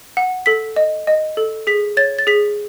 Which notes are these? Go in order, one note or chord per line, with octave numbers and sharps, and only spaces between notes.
F#5
A4 B6
D#5
D#5
A4
G#4 B6
C#5 A6
A6
G#4 B6